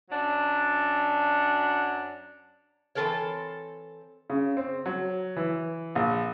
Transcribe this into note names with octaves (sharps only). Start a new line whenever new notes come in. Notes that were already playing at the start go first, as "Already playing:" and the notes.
F#2 F#3 D4
E3 G3 C4 A4 A#4 C#5
C#3
C4
F#3
E3
A#1